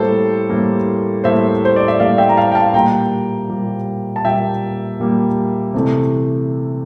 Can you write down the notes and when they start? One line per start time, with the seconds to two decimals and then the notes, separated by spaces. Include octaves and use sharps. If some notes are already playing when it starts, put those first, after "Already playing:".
Already playing: A2 G3 A#3 A4 C5
0.50 A2 G3 A#3
1.24 A2 G3 A#3 C5 E5
1.65 C5
1.76 D5
1.88 E5
2.00 A2 G3 A#3 D5 F5
2.18 E5 G5
2.29 A#5
2.37 F5 A5
2.52 G5
2.55 F5 A5
2.74 A#2 G3 A#3 G5 A#5
3.49 A#2 G3 A#3
4.16 A5
4.24 A#2 G3 A#3 E5 G5
5.00 A#2 G3 A#3
5.74 C3 E3 A3